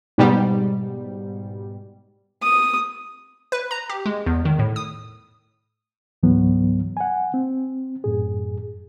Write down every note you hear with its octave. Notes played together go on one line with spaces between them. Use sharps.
G#2 B2 G3
D#6
B4
A#5
G4
G#3
E2
D#3
A2
D#6
C#2 G#2 E3 F#3 B3
F#5 G#5
C4
F#2 A2 G#4